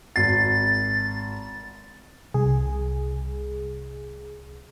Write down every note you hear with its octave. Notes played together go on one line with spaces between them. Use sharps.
G#1 F#4 A6 C7
C2 G#4